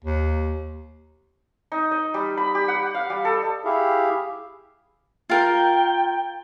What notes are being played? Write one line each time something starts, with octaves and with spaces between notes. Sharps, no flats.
D#2
D#4
D#5
G3
B5
G4
F#5
F5
G3
A4
E4 G4 G#4 E5 F5
F4 A#4 G5